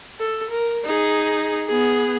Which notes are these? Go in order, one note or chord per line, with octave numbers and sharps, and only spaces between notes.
A4
A#4
D#4 G#4
B3 G#4